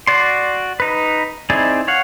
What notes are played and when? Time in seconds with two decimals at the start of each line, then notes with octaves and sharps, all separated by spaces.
0.07 F#4 D5 C6
0.80 D#4 B4
1.50 C4 D#4 E4 G#4 D5
1.88 C#5 F5 F#5